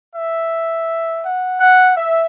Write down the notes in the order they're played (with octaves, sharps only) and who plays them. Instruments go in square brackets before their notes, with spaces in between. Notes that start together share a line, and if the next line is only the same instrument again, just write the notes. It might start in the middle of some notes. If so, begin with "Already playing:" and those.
[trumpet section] E5
F#5
F#5
E5